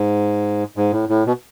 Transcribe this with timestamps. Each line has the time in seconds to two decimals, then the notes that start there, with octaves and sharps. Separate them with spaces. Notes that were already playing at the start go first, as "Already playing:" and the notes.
Already playing: G#2
0.77 G#2
0.92 A2
1.09 A2
1.26 B2